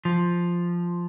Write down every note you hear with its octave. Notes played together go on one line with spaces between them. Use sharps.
F3